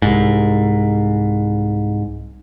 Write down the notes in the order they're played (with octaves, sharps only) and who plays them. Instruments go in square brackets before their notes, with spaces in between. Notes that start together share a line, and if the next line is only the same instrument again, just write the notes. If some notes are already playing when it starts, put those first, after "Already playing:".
[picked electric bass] C2 G#2